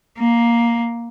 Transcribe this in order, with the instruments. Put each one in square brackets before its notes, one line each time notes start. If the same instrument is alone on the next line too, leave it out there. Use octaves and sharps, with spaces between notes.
[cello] A#3